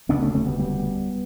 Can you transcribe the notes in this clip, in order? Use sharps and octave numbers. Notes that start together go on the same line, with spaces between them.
E1 D2 C#3 B3 D4
A3 C#4
A3 C#4
G3 B3
G3 B3